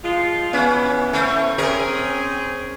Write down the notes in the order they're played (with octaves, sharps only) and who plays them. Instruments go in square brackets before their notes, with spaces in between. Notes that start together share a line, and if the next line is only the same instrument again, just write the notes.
[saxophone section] F3 G#3 F4
[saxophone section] E3 B3 [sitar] C#4
[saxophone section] E3 C4 C#4 [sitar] A3
[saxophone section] C4 G#4 [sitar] C#4 A#4